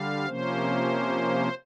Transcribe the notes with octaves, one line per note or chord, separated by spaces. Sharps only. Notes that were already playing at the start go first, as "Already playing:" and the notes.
Already playing: D3 G3 F5
C3 F3 A#3 C#4 C5